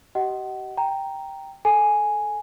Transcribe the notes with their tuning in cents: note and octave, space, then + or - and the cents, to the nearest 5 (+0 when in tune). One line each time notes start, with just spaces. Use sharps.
G4 -35 D#5 +0 F#5 +30
G5 +0 A#5 +0
A4 -10 G#5 +0